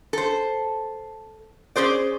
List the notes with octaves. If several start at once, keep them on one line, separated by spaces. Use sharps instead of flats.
A4 C5
C#4 G#4 C5 D5